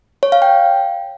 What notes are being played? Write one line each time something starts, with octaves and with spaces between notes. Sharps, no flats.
C#5
F5
G5